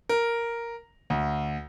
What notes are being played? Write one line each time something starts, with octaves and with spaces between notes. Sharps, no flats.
A#4
D2